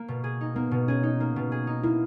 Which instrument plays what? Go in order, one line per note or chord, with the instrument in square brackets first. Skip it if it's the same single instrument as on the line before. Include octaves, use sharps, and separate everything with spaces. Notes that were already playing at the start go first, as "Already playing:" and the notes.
Already playing: [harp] A#3
B2
G#4
D#4
[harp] A#3 [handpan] B3
[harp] B2
[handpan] C#4 [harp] G#4
[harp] D#4
A#3
B2
G#4
D#4
[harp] A#3 [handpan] E4